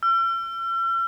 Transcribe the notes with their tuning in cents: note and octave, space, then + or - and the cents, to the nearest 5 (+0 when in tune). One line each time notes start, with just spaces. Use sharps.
E6 +45